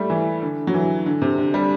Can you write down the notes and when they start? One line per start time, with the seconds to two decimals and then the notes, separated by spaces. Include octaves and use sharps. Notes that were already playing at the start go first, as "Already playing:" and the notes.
Already playing: G3 A3
0.10 E3
0.42 D3
0.67 F#3
0.74 E3
1.06 D3
1.22 C3
1.39 D3
1.54 G3